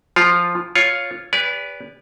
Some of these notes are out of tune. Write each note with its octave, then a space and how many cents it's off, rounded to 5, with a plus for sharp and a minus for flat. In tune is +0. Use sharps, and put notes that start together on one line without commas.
F3 +0 F4 +0
F4 +0 C#5 +0
G4 +45 B4 +0 D5 -30